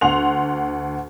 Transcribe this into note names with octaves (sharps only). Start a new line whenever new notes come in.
D2 F#5 C6 F7